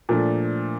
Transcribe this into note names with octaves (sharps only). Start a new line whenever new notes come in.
A#2 F3 A3 D4